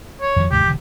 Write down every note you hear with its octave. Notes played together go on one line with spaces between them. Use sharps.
C#5
F2 D#3 F3
D#2 G#2 C3 G4
E1 D3